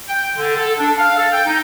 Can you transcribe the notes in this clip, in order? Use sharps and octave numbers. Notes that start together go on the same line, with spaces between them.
G5
D3
A4
D4
F5
A4
G5
D#4